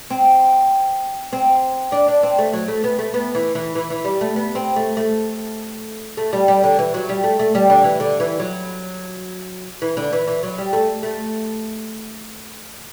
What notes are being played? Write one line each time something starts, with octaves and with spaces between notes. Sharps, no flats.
C4
C4
D4
D4
C4
A3
F#3
A3
B3
A3
B3
E3
E3
E3
E3
G3
A3
B3
C4
A3
A3
A3
G3
G3
D3
E3
F#3
G3
A3
A3
G3
D3
E3
D3
E3
F#3
E3
D3
E3
E3
F#3
G3
A3
A3